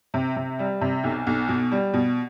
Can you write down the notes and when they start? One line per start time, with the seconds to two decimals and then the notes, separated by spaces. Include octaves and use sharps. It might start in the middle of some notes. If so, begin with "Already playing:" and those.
0.14 C3
0.36 C3
0.59 G3
0.81 C3
1.04 B1
1.27 B1
1.49 B2
1.72 G3
1.94 B2